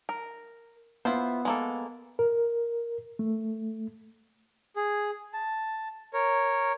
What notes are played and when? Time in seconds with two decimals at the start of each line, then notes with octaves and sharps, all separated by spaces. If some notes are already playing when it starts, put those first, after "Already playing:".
0.09 A#4
1.05 B3 E4 F4 C5
1.45 G#3 A#3 A4
2.19 A#4
3.19 A3
4.76 G#4
5.33 A5
6.13 A#4 C#5